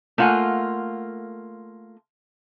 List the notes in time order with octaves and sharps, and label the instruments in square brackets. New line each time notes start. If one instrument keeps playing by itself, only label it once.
[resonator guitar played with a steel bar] A3 A#3 F4 F#5 G#5